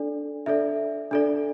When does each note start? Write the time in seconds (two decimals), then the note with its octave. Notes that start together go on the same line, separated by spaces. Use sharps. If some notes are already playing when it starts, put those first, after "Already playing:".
Already playing: D4 A4 D5
0.46 D4 A4 D5 E5
1.11 D4 A4 D5